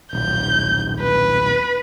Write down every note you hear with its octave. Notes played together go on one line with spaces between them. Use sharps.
D#1 B1 G6
B4